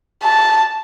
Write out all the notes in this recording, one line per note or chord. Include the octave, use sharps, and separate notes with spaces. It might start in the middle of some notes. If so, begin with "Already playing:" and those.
A5